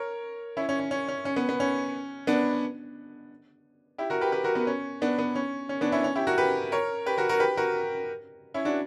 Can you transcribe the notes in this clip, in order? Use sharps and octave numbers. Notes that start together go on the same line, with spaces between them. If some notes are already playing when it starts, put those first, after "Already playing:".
Already playing: A#4 C#5
C#4 E4
C#4
C#4
C#4
C#4
C#4
B3
B3
C#4
B3 D4
E4 G4
F#4 A#4
G4 B4
G4 B4
F#4 A#4
B3
C#4
B3 D4
B3
C#4
C#4
B3 D4
C#4 E4
C#4
E4 G4
F#4 A#4
G4 B4
A#4 C#5
G4 B4
F#4 A#4
F#4 A#4
G4 B4
F#4 A#4
C#4 E4
D4 F#4